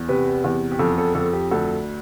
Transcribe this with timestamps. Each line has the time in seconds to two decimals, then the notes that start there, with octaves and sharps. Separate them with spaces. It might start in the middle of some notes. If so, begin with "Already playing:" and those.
Already playing: E2
0.08 C3 G4 B4
0.44 E2
0.71 G4
0.79 F2 A4
0.98 A4
1.15 F2 A4
1.33 G4
1.51 D2 A4